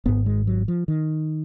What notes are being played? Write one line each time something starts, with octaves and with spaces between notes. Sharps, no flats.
G#1 G#2 B3
G#3
F#3
F3
D#3